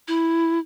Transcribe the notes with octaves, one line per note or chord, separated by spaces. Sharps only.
E4